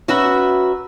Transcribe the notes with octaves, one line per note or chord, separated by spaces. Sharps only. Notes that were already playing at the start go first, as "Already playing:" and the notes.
C#4 F#4 B4 E5 F#5 A#5